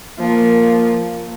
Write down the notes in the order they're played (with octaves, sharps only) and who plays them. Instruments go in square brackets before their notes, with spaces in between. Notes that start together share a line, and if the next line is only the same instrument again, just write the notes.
[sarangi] F3 [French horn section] A#3